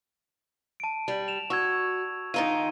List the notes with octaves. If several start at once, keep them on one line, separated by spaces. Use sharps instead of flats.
A5 D7
G3
E7 F7
F#4 C#6 E6 G#6
D#3 D#4 F4 D#7 G7